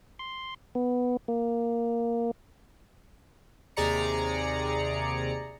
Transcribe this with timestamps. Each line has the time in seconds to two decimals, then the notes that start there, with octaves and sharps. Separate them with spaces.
0.19 C6
0.75 B3
1.28 A#3
3.77 D#2 C3 G#4 D5 A#5 C#7